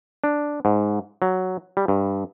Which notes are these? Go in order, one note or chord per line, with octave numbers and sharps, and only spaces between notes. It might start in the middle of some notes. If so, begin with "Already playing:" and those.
D4
G#2
F#3
G3
G2